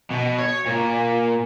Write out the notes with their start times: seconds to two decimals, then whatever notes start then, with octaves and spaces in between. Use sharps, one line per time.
0.11 B2
0.38 C#5
0.66 A#2